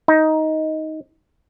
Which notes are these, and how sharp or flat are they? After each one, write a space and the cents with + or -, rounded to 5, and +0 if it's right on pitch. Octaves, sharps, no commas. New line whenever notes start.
D#4 +15